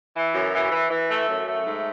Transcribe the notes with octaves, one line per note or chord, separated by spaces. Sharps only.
E3
F#2
E3
E3
E3
A3
F#2
A3
G#2